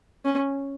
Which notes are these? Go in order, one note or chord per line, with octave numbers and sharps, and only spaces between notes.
C#4